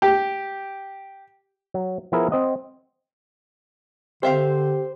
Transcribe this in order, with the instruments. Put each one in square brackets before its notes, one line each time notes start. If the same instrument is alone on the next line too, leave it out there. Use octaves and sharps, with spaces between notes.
[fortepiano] G4
[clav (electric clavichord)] F#3
F3 B3 E4 G#4 A#4
C4 D#5 F#5
[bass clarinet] D3 [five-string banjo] C4 E5 F5 [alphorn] G4 [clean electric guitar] C5